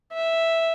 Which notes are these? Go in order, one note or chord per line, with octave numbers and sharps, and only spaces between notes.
E5